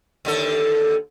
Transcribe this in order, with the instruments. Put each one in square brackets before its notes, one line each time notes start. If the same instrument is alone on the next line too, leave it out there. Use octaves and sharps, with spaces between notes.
[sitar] D#2 D3 A4